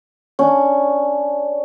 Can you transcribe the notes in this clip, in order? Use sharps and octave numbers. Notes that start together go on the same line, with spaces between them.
C#4 D4